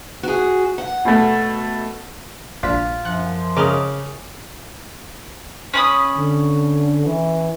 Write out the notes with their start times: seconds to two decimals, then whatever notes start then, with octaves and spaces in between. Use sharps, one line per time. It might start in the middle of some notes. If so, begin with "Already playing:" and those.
0.23 F#4 G#4
0.78 F#5
1.05 B2 A3
2.63 A#1 D4 F4 B6
3.05 F#2 F3 F#5
3.57 C#3 A#4 D#5 D6 D#6 F6
5.74 C#4 B5 D#6
6.18 D3
7.06 E3